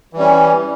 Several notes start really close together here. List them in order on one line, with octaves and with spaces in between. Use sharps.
E3 G3 C#4